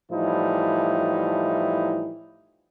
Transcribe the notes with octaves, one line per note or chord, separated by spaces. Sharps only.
A2 E3 F3 G3 D#4 E4